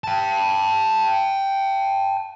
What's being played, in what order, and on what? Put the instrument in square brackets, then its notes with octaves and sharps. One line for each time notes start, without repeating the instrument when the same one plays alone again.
[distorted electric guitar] G5 A5